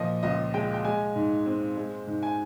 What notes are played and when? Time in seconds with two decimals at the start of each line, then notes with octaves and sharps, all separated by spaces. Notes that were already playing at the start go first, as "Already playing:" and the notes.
Already playing: A#2 F3 D#5
0.23 C#2 D#5
0.54 G#3 G5
0.74 G5
0.85 G#3 G#5
1.16 G#2
1.46 C4
1.77 G#3
2.07 G#2
2.23 G#5